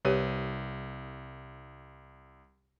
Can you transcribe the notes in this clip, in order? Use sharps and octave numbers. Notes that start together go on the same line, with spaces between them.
C2 G4 B4 C#5 D#7